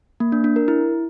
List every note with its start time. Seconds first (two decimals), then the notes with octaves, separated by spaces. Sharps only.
0.20 A#3
0.32 D4
0.44 D4
0.56 A#4
0.68 E4